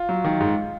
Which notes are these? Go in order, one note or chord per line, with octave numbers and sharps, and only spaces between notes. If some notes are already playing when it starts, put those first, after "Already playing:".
Already playing: F4
F#3
D#3
G#2